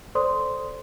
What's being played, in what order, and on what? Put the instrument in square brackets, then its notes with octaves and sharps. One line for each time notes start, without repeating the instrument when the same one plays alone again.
[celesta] A4 C5 D5 C6 D#6